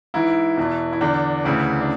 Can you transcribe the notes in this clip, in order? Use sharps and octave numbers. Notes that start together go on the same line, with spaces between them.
G#2 E3 E4
E2 B2
E4
E2 D3 D4
D2 C#3 E3
D4